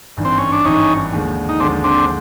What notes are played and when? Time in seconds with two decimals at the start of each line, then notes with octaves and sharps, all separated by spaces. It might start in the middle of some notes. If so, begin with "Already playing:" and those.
0.17 G#1 G2 E3
0.25 C4
0.38 C#4
0.52 D4
0.65 G#1 G2 E3 C#4 D#4
1.13 D#2 D3 F3 G#3
1.49 D#4
1.60 D#2 D3 F3 G#3 C4 D4
1.84 C4 D4